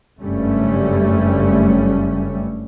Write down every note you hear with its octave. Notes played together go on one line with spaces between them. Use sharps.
F#1 G2 G3 A3 C#4